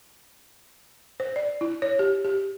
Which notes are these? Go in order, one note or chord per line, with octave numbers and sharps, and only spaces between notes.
C5
D5
E4
C#5
G4
G4